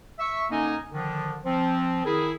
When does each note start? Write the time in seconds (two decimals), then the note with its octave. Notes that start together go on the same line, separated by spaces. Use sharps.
0.19 E5 C#6
0.50 D3 A#3 C#4 D#4 D#5 G#5
0.91 D3 D#3 F3
1.45 F3 C4
2.05 D#3 E4 G#4